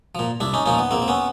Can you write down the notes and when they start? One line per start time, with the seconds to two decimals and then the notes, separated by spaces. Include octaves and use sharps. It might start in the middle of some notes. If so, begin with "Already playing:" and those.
0.15 A#2 F3
0.40 C2 D4 E4
0.54 C#4 D#4
0.65 A#2 F3 C#4 D#4
0.79 B3
0.91 A#1 A#3 C4
1.02 C4
1.08 B3 C#4